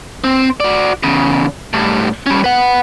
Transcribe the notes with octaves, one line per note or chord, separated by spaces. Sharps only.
C4
F#4 D5
E2 C#3
A2 G3
G3 C#4
B4 F#5